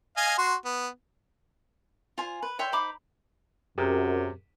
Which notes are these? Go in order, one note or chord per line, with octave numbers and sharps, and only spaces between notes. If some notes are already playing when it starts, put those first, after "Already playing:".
D#5 F5 G#5
F#4 C6
B3
F4 C5 G#5
B4
C#5 E5 G5 C6
D#4 C5 B5 D6
F#2 C3 G4 G#4 A#4